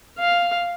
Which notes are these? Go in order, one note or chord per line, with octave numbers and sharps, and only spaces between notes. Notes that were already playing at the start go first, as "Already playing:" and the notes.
F5